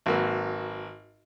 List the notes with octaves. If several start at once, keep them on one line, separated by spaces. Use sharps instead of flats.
G#1 F#3 A#3 F#4 B4